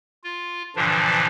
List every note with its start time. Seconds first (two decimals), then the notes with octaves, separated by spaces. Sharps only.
0.24 F4
0.76 G2 A#2 D3 E3 F3 D4